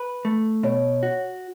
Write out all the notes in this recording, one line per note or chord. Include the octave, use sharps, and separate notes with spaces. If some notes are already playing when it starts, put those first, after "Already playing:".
Already playing: B4
A3
B2 C#5
F#4